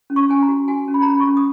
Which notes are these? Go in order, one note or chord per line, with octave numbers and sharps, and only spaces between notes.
C#4
C#6
C#4 G#5
A#5
F#4
F#4 G#5
C#4
B5
A#5
C#4 B5
C#6
C#4
D#6